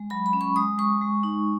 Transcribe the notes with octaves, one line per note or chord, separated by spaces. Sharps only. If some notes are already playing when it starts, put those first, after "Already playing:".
Already playing: G#3
F#3 B5
B5
C#4
C#6
G#3 D#6
G#3 C#6
G#3
D#4